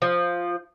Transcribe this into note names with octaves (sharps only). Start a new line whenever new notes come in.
F3